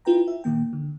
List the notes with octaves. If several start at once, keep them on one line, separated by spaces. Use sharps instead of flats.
E4 F4 B4 G5 A#5
E5
A#2 D#3 A#3 G5
D3